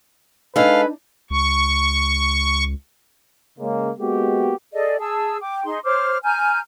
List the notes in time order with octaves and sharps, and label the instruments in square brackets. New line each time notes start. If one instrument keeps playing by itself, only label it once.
[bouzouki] G#3 A4 [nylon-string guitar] D4 D#4 [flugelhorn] B4 [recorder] F5
[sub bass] C#2 [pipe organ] C#6
[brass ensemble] C#3 G#3 A#3
G#3 A#3 B3 F#4 G4
[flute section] G#4 A4 D5 D#5
G#4 A5 E6
G5 D6
D#4 G#4 C6
C5 C#5 D6 F6
G#5 A#5 F6 G6